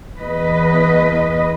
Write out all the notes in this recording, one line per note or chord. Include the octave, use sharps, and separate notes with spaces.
E2 B4 D#5